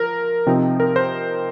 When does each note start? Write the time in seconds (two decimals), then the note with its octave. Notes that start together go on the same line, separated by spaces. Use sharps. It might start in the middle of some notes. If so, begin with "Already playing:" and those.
Already playing: F3 A#4
0.46 C3 F3 C4 D#4
0.80 A#4
0.96 C5